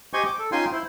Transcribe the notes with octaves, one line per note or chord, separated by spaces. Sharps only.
G4 C5 D#5 G#5 C#6
D6
A4
C#4 D#4 F4 G5 G#5 C6
E4 C5